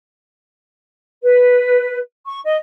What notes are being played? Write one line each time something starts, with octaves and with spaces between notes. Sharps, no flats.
B4
C#6
D#5